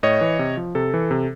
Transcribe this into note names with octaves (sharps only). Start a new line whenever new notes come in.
A2 C#5 D#5
E3
C3
F3
C3 A4
E3
C3